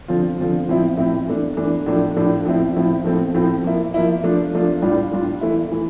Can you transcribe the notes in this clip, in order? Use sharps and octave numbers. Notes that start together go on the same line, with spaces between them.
D3 F3 C4 F4
D3 F3 C4 F4
A2 F3 C4 E4
A2 F3 C4 E4
E3 A3 D4
E3 A3 D4
A2 F3 A3 D4
A2 F3 A3 D4
A2 F3 C4 E4
A2 F3 C4 E4
A2 F3 A3 C4
A2 F3 A3 C4
F3 A#3 E4
F3 A#3 E4
F3 A3 D4 F4
F3 A3 D4 F4
A2 G3 D4 F4
A2 G3 D4 F4
E3 A3 E4
E3 A3